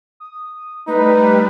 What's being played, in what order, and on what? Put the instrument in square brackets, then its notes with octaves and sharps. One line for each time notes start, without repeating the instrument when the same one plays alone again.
[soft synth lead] D#6
[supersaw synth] G3 [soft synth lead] A3 [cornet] D#4 [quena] B4